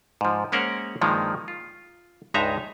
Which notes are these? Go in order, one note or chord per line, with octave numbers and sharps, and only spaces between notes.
G#2 F3
G#3 A#3 C#4 A#4 C5 F#5
G2 D#3 F3 G#3 A#3
F4
C#2 G2 G#3 D#4 E5 A#5